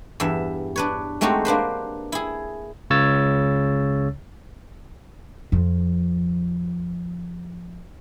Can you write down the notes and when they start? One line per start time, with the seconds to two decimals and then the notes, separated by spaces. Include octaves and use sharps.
0.20 E2 G2 E5
0.76 D4 B4 C#5
1.21 G#3 A3 C4 D#4 F#4 G4
1.45 A#3 D4 B4 C5
2.12 E4 G#4
2.90 C#2 C#3 C#5 E6 A6
5.52 F2 F3